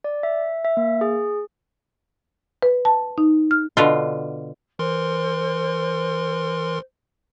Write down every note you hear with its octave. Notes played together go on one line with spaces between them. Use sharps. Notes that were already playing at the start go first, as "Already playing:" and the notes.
D5
E5
E5
A#3
G#4
B4
A5
D#4
F6
B2 D3 F4
E3 A#4 C5 C6